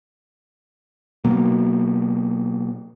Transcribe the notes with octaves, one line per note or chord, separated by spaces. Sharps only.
B2 F#3 A#3